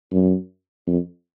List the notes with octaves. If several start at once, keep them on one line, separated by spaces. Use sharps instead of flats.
F#2
F2